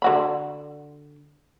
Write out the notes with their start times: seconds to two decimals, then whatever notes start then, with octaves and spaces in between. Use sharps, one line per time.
0.02 D3 F#4 B5